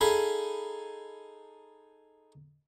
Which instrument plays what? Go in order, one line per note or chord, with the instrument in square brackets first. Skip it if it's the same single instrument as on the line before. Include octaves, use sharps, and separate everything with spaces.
[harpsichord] D#4 G#4 A4 F5 B5